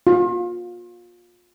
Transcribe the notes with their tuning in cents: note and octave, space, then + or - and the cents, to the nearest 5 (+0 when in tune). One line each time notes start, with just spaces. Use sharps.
F4 +30